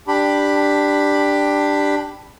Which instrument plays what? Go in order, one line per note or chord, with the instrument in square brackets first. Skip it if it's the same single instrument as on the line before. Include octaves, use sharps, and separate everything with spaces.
[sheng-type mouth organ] D4 G4 B5